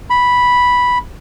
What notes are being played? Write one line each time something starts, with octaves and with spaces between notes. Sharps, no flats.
B5